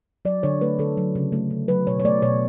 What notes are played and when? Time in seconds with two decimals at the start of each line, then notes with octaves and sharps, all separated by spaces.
0.25 F#3 D5
0.43 D3 C#5
0.61 A3 B4
0.79 D3 A4
0.97 F#3
1.15 C#3
1.32 A3
1.51 C#3
1.68 F#3 B4
1.87 B2 C#5
2.00 C#5
2.05 A3 D5
2.22 B2 C#5